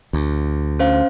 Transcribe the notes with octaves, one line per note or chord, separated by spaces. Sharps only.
D2
C#4 C5 F5